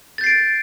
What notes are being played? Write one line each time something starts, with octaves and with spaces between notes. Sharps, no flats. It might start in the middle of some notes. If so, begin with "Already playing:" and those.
G6 A6 C7 D7